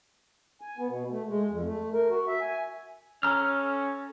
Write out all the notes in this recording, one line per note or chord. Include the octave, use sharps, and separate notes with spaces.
G#5
B3
B2
A3
G#3
F2
A3
A#4
F#4
E5
G#5
C#4 A4 A#5 F6